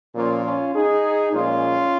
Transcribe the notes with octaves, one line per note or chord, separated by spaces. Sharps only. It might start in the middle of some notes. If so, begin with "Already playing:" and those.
A#2 F3 A#3 C#4 F4
C#4 F4
D#4 G#4
A#2 F3 G#3 C#4 F4